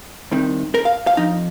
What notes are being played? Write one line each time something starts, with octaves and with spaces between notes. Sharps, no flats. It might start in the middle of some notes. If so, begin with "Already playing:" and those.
C2 C3 D#3
A#4
F5
F5
F2 F3 D#4